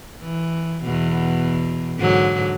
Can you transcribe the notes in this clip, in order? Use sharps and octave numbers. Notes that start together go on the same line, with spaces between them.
E3
E2 B2
G#2 D3 F#3